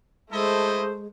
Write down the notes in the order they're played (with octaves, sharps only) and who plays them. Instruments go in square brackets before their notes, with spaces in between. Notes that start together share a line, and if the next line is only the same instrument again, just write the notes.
[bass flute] G#3 [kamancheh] A3 C5 [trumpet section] E4 A4 D#5